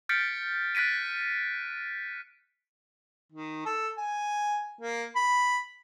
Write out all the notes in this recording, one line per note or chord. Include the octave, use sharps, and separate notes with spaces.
F6 G6 A6 B6 C#7 D7
F#6 A6 B6 D7 D#7
D#3
A4
G#5
A#3
B5